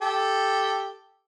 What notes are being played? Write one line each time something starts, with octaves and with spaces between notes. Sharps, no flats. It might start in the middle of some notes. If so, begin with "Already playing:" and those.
G4 A4